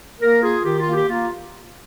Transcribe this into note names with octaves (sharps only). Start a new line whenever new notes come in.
A#3 A#4
F4 G#4
D#3 G4
F4
A#3
G4
A#3 F4